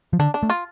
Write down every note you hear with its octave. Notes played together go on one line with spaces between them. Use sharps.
F3
D3 D4
D4
A3
F4